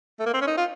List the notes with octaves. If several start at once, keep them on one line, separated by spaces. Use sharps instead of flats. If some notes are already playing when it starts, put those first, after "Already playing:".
A3
A#3
C4
C#4
D#4
F4